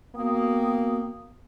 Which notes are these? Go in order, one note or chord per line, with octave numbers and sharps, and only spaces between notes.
A#3 B3 F#4 G5 D#6